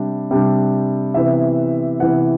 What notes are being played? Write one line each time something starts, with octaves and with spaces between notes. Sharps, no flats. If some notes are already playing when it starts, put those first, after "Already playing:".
Already playing: C3 G3 D4
C3 G3 D4
C3 E3 B3 E5
C3 E3 B3 F#5